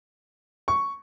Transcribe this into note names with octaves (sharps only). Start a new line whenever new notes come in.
C#6